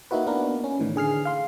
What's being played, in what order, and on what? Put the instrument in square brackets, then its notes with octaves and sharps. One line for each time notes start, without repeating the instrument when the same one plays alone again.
[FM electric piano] A#3 D#4 E4 F#4 B4
A#3 B3 D4 A#4 B4
C#4
A2 D#3 E3
D3 G#4 F6 C7
F5 C6